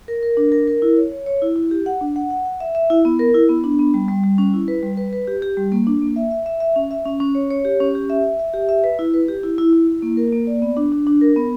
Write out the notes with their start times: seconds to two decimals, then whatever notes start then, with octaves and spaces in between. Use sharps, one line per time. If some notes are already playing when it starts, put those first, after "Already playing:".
0.08 A#4
0.23 A#4
0.37 D4
0.52 A#4
0.67 A#4
0.82 E4
0.97 C#5
1.12 C#5
1.26 C#5
1.42 E4
1.56 E4
1.71 G4
1.86 F#5
2.01 D4
2.16 F#5
2.31 F#5
2.45 F#5
2.60 E5
2.75 E5
2.90 E4
3.05 B3
3.19 A#4
3.34 E4
3.49 B3
3.64 D4
3.79 B3
3.94 G3
4.08 G3
4.24 G3
4.38 C#4
4.54 E4
4.68 B4
4.83 G3
4.97 B4
5.13 B4
5.27 G4
5.42 G4
5.57 G3
5.72 A#3
5.87 D4
6.02 A#3
6.16 E5
6.31 E5
6.46 E5
6.60 E5
6.76 C#4
6.91 E5
7.05 C#4
7.20 C#4
7.35 C#5
7.50 C#5
7.65 G4
7.80 C#4
7.95 G4
8.10 E5
8.24 E5
8.39 E5
8.54 G4
8.69 E5
8.84 B4
8.99 E4
9.14 B4
9.28 G4
9.43 E4
9.58 E4
9.73 E4
9.87 E4
10.02 A#3
10.17 A#4
10.32 A#3
10.47 D5
10.62 B3
10.77 D4
10.92 D4
11.07 D4
11.21 A#4
11.36 B3